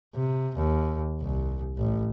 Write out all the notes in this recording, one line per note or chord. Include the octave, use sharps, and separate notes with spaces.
C3
D#2
C2
A1